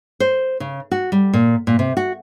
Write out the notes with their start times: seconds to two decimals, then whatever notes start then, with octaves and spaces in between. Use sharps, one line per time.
0.20 C5
0.60 C#3
0.91 F#4
1.12 G3
1.33 A#2
1.67 A#2
1.79 C3
1.97 F#4